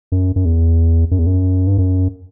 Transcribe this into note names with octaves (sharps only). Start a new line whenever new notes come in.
F#2
F#2
E2
F#2
E2
F#2
G2
F#2